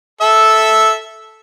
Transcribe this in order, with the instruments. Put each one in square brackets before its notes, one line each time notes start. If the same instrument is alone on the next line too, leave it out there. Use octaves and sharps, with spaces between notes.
[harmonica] A4 E5 E6